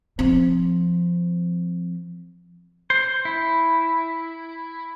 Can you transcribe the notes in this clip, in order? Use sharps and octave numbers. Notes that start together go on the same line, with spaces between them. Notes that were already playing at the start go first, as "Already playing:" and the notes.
F3 C4
C5
E4